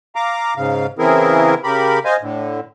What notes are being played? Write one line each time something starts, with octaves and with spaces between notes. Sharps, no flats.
F5 A#5 D6
G#2 C#3 F5
C#3 E3 C4 E4 G#4 A#4
C#3 G4 A#4 B5
C5 D#5 F5 G#5
A2 D3